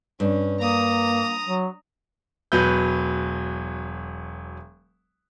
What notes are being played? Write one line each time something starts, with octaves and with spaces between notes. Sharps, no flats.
G2 C#4
A#3 A#5 D#6
F#3
E1 F#3 B4 G6